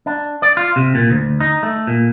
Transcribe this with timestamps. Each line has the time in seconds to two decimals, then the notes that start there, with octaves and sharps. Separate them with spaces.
0.06 D4
0.42 D5
0.57 F4
0.76 C3
0.95 A#2
1.10 D2
1.40 D#4
1.63 A3
1.87 A#2